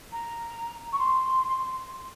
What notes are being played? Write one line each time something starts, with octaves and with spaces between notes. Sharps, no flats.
A#5
C#6
C6